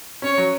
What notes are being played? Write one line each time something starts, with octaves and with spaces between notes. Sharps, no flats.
C#4 C#5
F#3